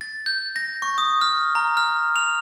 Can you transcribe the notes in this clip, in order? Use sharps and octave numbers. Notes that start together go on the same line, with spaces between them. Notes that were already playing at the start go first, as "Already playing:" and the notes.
A6
G6
A#6
C#6
D#6
F6
A#5
F6
F7